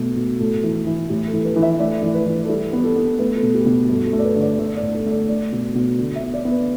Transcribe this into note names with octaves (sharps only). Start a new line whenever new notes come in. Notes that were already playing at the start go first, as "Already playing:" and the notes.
Already playing: B2 A3
B2
A2 A4
E3
E3
A2 G4
A4
E3
B4
E3
E5
A3 D5
E3
B4
E3
A4
G3 G4
B3
A4
B3
A3 B4
A4
B2
G4
B2
G2 A4
A4
A3
D5
B4
D3
D5
A3 D5
D5
A2
A4
A3
D5
A3 D5
B2
B2
D3 A4
E5
B3
D5
B3
B4